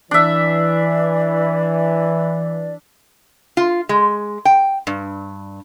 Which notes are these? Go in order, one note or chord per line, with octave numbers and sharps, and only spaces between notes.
E3 D4 D5 E5
F4
G#3
G5
G2